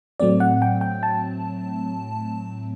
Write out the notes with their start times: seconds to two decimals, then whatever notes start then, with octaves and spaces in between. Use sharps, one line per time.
0.20 A2 F#3 A3 C4 D5
0.40 F#5
0.62 G5
0.81 G5
1.03 A5